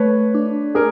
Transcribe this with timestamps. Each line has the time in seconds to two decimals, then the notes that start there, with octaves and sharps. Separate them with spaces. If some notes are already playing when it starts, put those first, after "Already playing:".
Already playing: A3 B4 C#5
0.34 D4
0.75 D4 G#4 A#4